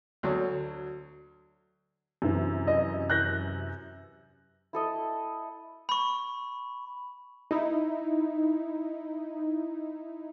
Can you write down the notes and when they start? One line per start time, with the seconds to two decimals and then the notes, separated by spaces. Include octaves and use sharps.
0.23 D2 F#3
2.22 F#2 C3 E3
2.67 D#5
3.10 F#6 G6 A#6
4.73 E4 A4 D#5
5.89 B5 C#6
7.51 D#4 E4